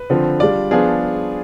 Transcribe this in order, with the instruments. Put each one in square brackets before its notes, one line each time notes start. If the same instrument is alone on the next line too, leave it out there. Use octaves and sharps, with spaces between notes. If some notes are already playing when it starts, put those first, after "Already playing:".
Already playing: [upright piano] B4
D3 F3 C4
G3 D4 F4 D5
F3 B3 D4 F4 G#4